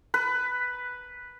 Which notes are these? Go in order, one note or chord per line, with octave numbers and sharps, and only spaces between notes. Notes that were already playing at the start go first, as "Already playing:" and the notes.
B4